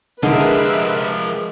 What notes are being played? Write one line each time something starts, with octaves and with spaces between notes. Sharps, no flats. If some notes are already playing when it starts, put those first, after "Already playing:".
D3 F3 G#3 G4 A#4 B4 E5